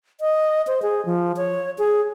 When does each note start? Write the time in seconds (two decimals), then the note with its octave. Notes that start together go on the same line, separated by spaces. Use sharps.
0.21 D#5
0.67 C5
0.82 G#4
1.06 F3
1.37 C#5
1.78 G#4